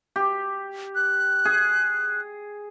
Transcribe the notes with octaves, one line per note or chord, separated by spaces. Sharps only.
G4
F#6
G#4